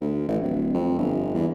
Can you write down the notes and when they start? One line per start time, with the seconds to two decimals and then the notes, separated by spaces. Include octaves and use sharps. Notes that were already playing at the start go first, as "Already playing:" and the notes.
0.01 D2
0.28 A1
0.43 D1
0.74 F2
0.98 G1
1.34 E2